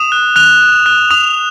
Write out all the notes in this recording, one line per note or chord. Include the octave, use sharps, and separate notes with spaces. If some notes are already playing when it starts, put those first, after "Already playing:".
Already playing: D#6 E7
F#6
F#6 F7
F#6
F#6
D#6 F7